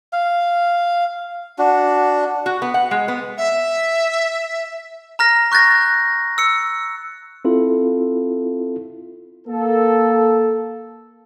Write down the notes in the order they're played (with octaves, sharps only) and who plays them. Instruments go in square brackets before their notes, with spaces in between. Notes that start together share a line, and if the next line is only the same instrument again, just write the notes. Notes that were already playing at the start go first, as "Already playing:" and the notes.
[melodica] F5
D4 F#4
[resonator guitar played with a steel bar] F#4
B3
F#5
G#3
B3
[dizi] E5
[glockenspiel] A#5 F6 A#6
C#6 F#6 G6 A6 A#6
E6 C#7
[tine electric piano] C4 E4 F4 A4
[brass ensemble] A#3 A4